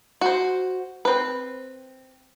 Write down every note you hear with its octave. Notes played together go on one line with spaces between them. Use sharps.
F#4 C5
C4 B4